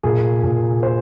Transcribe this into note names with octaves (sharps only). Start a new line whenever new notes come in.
A#2 G#4
A#2
C5